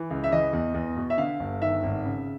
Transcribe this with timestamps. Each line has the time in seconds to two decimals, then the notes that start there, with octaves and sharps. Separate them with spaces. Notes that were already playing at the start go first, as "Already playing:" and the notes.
Already playing: E3
0.10 C#2
0.24 E5
0.31 E3 D#5
0.53 E2
0.74 E2
0.97 B2
1.10 E5
1.18 D3 F5
1.40 G1
1.61 D#3 E5
1.83 G#1
2.05 C#3